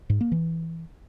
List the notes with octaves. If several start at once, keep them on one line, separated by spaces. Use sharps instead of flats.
G#2
A#3
E3